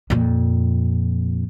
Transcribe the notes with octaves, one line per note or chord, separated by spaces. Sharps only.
F2 A#2